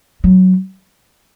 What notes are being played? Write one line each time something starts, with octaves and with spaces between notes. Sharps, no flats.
F#3